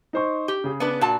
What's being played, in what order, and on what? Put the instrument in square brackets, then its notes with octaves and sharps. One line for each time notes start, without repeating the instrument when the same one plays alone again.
[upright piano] D#4 C5 C#6
[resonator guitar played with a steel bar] G4
[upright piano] C#3 G#4
[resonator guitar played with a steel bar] B3 D4 B4
A#2 F#4 A5